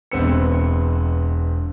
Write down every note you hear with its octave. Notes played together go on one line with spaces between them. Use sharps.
E1 B3 C4 E6 C#7